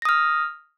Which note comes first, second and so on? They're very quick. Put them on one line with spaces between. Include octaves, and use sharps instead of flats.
A#6 D#6 F6